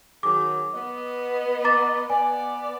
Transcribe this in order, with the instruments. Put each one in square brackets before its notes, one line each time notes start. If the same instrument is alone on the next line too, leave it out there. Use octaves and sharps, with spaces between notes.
[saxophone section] D#3 F#3 G#4 [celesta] D6
[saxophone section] B3 D#5
[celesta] A#5 D6 A6
[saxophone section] B3 D5 [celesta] G#5